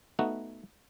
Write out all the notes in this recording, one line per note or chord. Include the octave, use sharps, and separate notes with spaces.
A3 B3 D#4 F#4